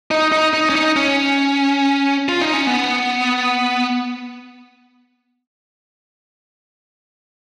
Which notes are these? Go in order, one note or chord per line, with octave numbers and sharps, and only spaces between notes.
D#4
D#4
D#4
C#4
D#4
C#4
F4
D#4
C#4
B3